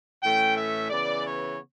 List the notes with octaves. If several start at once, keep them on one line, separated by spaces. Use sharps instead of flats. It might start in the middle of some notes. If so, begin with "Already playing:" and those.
A2 E3 A3 C#4 G5
E5
C#3 E3 B3 D5
C#5